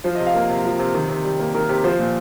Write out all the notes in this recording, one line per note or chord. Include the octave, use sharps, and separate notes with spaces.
F3 C5
C3 D#5
F5
A#3
C3
F3
C3
D#3
C3
G3
A#3
D#3 A#4
C3 G4
F3 C5
A#2